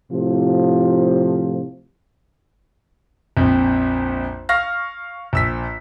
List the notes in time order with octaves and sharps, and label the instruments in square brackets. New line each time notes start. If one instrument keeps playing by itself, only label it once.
[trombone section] A2 C3 F3
[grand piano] A#1 F2
F5 C#6 F6 A#6
A#1 E6 B6